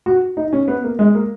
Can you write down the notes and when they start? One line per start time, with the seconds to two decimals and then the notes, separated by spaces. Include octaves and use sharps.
0.06 F#4
0.37 D#4
0.53 C#4
0.68 B3
0.84 A#3
0.99 G#3
1.15 A#3